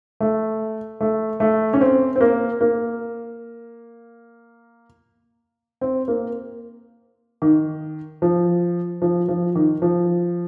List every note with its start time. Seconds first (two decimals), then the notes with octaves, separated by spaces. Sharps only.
0.20 A3
1.01 A3
1.40 A3
1.73 C#4
1.81 C4
2.16 C4
2.21 A#3
2.61 A#3
5.81 C4
6.08 A#3
7.42 D#3
8.22 F3
9.02 F3
9.28 F3
9.55 D#3
9.82 F3